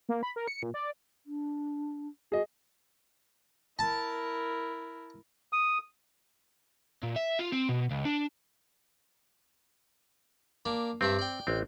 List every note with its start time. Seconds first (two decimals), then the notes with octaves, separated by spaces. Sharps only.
0.09 A#3
0.23 B5
0.36 A#4
0.48 C#7
0.63 A#2
0.74 D5
1.26 D4
2.32 F#4 G#4 D#5
3.79 E4 A#4 A5
5.53 D#6
7.03 A#2
7.16 E5
7.39 F4
7.52 C4
7.69 B2
7.91 C#2
8.05 D4
10.66 A#3 D4
11.01 G2 C4 D4 E5
11.19 D5 G5
11.47 A1 C4